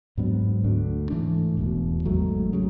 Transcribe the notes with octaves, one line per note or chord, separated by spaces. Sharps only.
G#2 F#3 B3 D4
D2 D3 A3 D4
G#2 E3 A3 D4
E1 E2 B2
G#1 G#2 F#3 A3
C#3 F#3